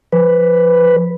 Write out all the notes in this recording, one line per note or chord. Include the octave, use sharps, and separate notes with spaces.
F3 B4